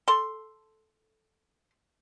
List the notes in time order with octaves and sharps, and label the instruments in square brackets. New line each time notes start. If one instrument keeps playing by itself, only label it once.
[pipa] A4 C6